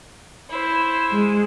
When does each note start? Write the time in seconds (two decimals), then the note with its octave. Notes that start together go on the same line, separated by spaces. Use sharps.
0.50 E4 C5
1.12 G#3